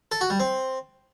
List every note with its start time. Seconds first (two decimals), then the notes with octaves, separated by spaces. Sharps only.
0.12 A4
0.21 F#4
0.30 G3
0.40 C4